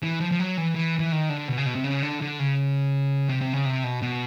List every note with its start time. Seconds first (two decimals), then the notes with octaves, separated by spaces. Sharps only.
0.03 E3
0.21 F3
0.31 F3
0.40 F#3
0.57 E3
0.75 E3
0.99 E3
1.12 D#3
1.29 D3
1.48 B2
1.58 C#3
1.66 B2
1.75 C3
1.84 C#3
2.02 D3
2.21 D3
2.39 C#3
3.29 C3
3.41 C3
3.53 C#3
3.65 C3
3.84 B2
4.02 B2